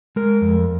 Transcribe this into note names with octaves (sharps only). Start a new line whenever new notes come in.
G#3 A#4
F2